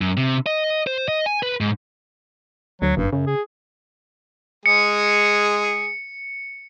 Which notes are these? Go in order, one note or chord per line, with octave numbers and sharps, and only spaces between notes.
F#2
C3
D#5
C5
D#5
G#5
B4
G#2
D2 F#3
F#1 G2
F#2 C#3
G#4
G#3 G#4 C#7